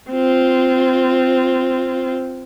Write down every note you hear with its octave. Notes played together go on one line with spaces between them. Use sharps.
C4 F4